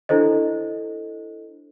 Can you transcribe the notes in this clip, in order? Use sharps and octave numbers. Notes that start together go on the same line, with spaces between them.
D4 E4 A4 C5 D#5